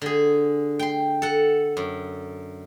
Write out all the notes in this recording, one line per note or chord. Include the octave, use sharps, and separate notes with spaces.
D3 G#4
G5 C6
A4 F#5
F#2